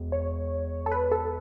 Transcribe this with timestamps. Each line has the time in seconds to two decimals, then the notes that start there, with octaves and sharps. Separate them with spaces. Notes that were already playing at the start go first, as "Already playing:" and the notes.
Already playing: E1
0.12 C#5
0.86 A4
0.92 B4
1.12 A4